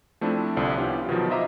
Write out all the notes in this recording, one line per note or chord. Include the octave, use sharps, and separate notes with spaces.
F3 A3 C4 D4 E4
C2 D3 F3 D4
B3 C#4 D4 E4 F4 G4
B2 D#3 F3 F#3
F4 C5 D#5 E5 A#5 D6